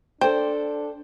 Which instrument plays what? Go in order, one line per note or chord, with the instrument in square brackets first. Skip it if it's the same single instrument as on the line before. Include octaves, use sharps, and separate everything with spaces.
[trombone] D4 [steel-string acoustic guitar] A4 D5 [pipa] C5 [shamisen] G5